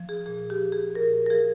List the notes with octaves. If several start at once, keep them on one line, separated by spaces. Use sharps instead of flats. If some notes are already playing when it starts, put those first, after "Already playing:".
Already playing: F3
G#4
A#2 G#4
G4
F3
G#4
A#2 A#4
A#4
A#4
F3 G#4